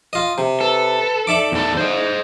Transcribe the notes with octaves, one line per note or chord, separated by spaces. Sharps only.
F4 D#5
C3
A4 B4
D#4 D5 E5 D6
E2 A4
C5 D#5